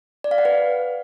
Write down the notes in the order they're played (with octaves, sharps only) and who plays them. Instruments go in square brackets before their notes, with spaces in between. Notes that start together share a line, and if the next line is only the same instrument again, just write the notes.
[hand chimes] D5
F5
F#5
B4